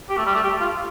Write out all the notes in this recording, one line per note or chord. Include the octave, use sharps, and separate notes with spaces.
G4
A3
G3
A3
G4
F4